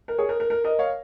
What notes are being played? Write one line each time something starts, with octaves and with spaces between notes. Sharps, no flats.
A#4
G#4 C#5
A#4
A#4
A#4
A#4 D#5
C#5 F5